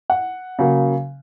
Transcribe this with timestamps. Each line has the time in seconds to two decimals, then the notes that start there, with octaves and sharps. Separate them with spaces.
0.10 F#5
0.59 C#3 F#3 A#3